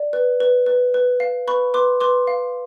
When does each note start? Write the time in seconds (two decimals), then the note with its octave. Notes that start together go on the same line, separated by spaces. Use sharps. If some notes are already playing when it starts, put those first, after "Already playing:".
Already playing: D5
0.13 B4
0.40 B4
0.66 B4
0.94 B4
1.20 F5
1.48 B4 B5 C#6
1.74 B4 C6 D6
2.00 B4 C6 D6
2.27 F5